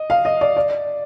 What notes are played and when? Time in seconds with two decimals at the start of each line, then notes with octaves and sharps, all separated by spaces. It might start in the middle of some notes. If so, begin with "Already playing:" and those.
Already playing: D#5
0.10 F5
0.25 D#5
0.41 D5
0.57 D5